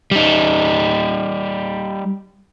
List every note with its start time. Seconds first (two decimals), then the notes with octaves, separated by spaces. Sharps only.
0.11 G3 D#4